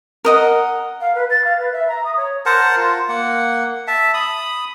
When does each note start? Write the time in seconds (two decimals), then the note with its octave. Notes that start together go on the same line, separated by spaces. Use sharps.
0.25 A#4 D#5 F#5
1.00 F5
1.14 B4
1.30 A6
1.44 F5
1.59 B4
1.72 E5
1.88 A#5
2.04 D#6
2.16 C#5
2.46 A#4 C5 F#5 A5
2.77 F4
3.09 A#3 F#5
3.87 E5 A5
4.14 B5 D#6